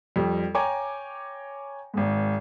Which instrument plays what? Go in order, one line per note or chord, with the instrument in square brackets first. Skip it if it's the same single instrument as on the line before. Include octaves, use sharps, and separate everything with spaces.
[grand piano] F2 G3
C#5 G5 G#5 A#5 D6
G#1 G#2